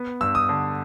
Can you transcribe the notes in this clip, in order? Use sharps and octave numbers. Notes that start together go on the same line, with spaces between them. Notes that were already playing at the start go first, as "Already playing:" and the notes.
Already playing: B3
G2 E6
D#6
D3